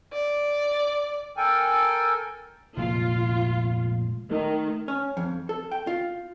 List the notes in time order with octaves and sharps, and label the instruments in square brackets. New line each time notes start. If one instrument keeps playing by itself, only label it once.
[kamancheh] D5
[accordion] A4 A#4 G5 G#5
[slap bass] F1 A#2 G#3 [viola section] F4
[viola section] D#3 [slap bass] A3
[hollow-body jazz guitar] C#4
F2
A4
G5
F4